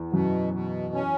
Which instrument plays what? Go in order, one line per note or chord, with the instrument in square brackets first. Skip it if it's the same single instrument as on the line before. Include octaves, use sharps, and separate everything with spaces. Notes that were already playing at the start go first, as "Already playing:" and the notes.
Already playing: [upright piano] E2
[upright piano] F#2 [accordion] B2
[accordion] B2
C#4